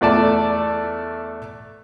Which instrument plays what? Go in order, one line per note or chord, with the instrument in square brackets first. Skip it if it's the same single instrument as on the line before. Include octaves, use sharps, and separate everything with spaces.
[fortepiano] E2 A3 D5 A5